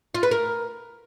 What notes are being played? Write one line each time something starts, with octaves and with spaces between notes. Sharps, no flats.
F4
B4
A#4